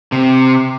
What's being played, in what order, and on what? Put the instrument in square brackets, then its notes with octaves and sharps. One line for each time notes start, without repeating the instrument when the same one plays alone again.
[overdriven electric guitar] C3